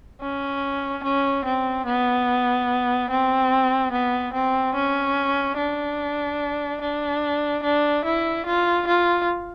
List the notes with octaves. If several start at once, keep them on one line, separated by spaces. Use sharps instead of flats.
C#4
C#4
C4
B3
C4
B3
C4
C#4
D4
D4
D4
E4
F4
F4